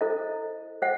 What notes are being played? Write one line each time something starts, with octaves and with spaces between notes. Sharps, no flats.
E4 A4 C5 D#5
C5 D#5 F#5